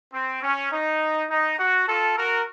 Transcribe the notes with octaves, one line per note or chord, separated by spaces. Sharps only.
C4
C#4
D#4
D#4
F#4
F4 A4
F#4 A#4